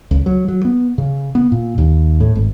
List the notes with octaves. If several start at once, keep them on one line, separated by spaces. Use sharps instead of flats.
C#2
F#3
F#3
B3
C#3
B3
A#2
D#2
A2
G#1